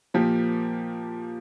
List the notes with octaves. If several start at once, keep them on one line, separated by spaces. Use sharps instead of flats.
A#2 F3 A#3 G4